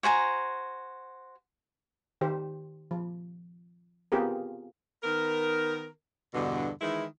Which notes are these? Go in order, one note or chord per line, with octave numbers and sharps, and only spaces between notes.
F#4 C5 G#5 A#5
D#3 G4 C5
F3
B3 C4 F4 G4 G#4 A#4
D#3 B3 A#4
E2 G2 B2 D3
D#3 E3 G#3 E4